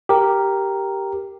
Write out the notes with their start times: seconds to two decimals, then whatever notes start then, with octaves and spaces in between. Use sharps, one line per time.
0.09 G4 A#4